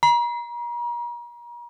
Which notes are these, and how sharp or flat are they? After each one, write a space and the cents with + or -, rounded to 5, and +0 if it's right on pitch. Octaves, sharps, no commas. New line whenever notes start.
A#5 +40